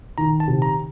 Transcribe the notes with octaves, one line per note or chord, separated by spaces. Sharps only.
D#3 A#5
A5
C3
A#5